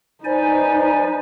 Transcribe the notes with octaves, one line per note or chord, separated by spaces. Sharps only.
D#4 B4 C5 D5 G#5